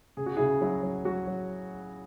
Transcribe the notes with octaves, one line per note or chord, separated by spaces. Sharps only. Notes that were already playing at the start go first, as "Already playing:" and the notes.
C#3 G#4
F#4
C#3 E4 G#4
F#3 E4
F#3
F#3 F#4
F#3